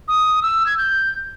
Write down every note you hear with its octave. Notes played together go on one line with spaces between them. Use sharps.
D#6
E6
G#6
G6